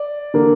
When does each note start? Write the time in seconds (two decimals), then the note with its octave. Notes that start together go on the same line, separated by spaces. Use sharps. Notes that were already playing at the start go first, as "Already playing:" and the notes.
Already playing: D5
0.34 D3 A#3